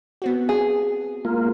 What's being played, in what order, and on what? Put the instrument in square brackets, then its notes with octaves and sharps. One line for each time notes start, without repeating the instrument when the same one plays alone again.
[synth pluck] B3 C4 F#4
[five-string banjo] G#4
[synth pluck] G#3 [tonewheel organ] A#3 F4